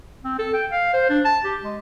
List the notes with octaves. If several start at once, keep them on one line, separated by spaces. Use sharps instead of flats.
C4
A4
G5
F5
C5
D4
A5
G4
G#3